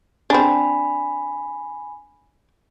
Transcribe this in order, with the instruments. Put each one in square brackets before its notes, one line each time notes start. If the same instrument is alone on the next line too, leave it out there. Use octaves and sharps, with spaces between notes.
[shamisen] C4 D4 [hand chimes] G#5 B5